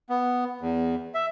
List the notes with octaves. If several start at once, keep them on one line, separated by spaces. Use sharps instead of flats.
B3
E2
E5